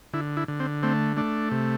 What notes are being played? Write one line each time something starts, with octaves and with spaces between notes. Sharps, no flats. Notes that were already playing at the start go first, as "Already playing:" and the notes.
D3 E4
E4
D3
C4
A3 C4
A3 D4
C3